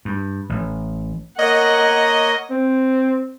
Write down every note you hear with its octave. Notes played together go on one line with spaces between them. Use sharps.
G2
A1
A#3 A#4 C#5 D#5 F#5
C4